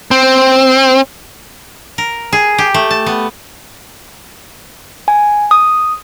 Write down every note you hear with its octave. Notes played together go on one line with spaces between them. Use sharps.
C4
A#4
G#4
G4
A3
A5
B3
G#5
D#6